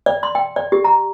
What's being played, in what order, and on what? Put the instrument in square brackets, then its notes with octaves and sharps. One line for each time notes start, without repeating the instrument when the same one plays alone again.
[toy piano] D5
C6
G5
D5
G4
A#5